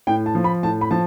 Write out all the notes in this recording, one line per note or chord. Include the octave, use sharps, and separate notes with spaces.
A2 G5
A5
F3
B5
A2 A5
B5
F3 A5